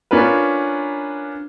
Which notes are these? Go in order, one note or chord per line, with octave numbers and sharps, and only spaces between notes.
C#4 D4 F4 A#4 B4